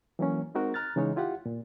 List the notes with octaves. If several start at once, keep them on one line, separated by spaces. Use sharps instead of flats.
E3 F#3 A#3 C#4
G#3 C4 D#4 F#4 A#4
A#5 F6 F#6 A6
C#3 E3 G#3 D#4 C#5
E4 F4 G4 F5 F#5
A#2